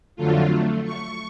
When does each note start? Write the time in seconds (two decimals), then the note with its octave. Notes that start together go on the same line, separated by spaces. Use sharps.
0.16 F2 D3 F#3 A3 F4
0.51 A3
0.85 C#6